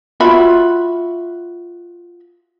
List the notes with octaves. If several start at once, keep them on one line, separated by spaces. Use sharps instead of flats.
F4 F#4 E5 B5